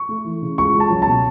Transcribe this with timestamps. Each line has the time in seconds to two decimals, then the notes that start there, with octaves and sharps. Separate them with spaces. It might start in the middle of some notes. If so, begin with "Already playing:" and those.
Already playing: C#6
0.09 A3
0.25 E3
0.42 C#3
0.58 C#2 C#6
0.74 C#2
0.80 A5
0.90 F#3
1.02 B2 A5